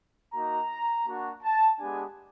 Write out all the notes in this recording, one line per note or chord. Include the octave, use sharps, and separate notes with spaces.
A#3 D#4 F#4 A#5
A#3 D4 F#4
A5
G#3 B3 D4 G4 G#5